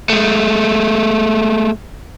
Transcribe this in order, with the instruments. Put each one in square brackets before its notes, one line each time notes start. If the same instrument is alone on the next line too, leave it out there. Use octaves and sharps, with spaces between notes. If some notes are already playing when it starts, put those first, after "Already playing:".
[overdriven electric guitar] G#3 A3